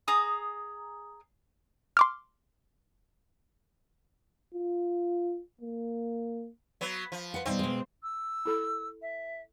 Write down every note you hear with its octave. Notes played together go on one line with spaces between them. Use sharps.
G#4 A#5 D#6
C6 D6 F6
F4
A#3
F#3 B3
F3
B4 F#5
B2 G3 C4 D#4
B2 G#3
E6
E4 A4 B5
E5